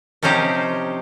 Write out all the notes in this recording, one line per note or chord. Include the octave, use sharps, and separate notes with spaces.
C3 F3 C#4 D#4 G4 C5